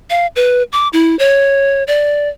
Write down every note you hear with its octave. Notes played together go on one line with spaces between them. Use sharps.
F5
B4
D6
E4
C#5
D5